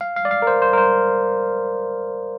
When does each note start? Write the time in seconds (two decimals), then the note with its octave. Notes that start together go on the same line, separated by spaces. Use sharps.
0.01 F5
0.16 F5
0.25 D5
0.31 F5
0.42 A#4
0.47 C5
0.62 C5
0.73 A#4
0.78 C5